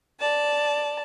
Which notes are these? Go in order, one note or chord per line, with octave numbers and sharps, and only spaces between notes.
D5 A5